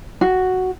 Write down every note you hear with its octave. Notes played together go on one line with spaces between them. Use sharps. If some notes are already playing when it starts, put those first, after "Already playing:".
F#4